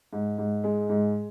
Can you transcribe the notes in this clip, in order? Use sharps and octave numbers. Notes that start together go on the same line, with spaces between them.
G#2
G#2
G#3
G#2